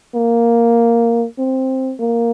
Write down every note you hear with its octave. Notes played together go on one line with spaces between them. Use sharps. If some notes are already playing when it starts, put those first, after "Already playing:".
A#3
C4
A#3